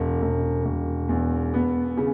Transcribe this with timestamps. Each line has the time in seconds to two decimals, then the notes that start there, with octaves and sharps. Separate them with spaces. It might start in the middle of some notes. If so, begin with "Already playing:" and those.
Already playing: E1
0.22 E1
0.65 E1
1.09 E2
1.54 B3
1.97 C#3